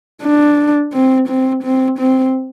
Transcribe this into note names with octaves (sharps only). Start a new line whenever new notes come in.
D4
C4
C4
C4
C4